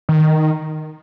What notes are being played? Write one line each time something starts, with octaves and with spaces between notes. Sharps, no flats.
D#3